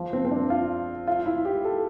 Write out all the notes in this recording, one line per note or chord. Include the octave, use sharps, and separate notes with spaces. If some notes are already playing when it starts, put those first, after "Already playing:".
Already playing: F3
C4
C4
D4
F4
F4
E4
G4
A4